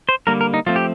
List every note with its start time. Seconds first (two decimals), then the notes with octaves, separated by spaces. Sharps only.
0.09 C5
0.27 D3 G3 A#3 A#4
0.41 A#4
0.54 D#4
0.66 F3 A3 C4 F4
0.76 G4